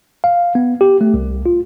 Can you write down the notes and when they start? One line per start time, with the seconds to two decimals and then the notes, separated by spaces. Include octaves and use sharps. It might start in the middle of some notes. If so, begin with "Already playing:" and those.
0.24 F5
0.55 B3
0.81 G4
1.01 A3
1.14 C2
1.46 F4